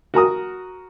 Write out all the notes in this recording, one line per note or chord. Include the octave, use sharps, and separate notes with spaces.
F#4 A#4 A#5 D#6